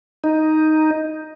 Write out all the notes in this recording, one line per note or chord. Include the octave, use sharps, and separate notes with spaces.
D#4